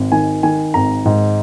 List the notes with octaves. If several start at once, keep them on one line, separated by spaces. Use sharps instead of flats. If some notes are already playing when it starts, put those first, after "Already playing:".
Already playing: G#1
D#3 G#5
D#3 G#5
G#1 A#5
G#2